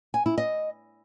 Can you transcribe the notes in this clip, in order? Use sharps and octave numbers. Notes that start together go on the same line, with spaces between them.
G#5
E4
D#5